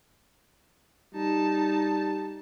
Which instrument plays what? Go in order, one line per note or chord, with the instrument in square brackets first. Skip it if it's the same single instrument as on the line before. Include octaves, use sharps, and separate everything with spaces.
[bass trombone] G3 [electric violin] D#4 A5